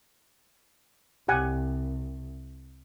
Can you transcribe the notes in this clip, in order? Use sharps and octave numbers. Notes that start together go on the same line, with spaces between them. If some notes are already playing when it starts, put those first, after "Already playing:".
C2 G4 F#5 G#5